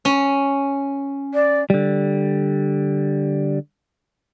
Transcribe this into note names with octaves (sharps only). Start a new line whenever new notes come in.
C#4
D5
D3 G3